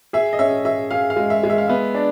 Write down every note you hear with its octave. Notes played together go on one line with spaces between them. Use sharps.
G#4 E5
D#5
C#4 E5
G#4 E5
G#4 F5
F5
G#3
E5
G#3
E5
F5
B3 E5
D4